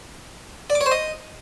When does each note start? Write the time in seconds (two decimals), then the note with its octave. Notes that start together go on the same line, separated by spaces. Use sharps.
0.70 D5
0.75 D6
0.81 C#5
0.86 C5
0.91 D#5